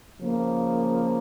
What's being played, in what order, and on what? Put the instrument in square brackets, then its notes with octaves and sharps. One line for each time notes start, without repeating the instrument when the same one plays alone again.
[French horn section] C#3 F3 A#3